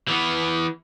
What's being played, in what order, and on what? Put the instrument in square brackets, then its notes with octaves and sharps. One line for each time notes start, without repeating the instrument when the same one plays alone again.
[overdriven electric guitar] E3 B3